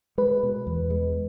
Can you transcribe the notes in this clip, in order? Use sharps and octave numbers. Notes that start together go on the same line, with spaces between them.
G#3 B4
B2
E2
G#3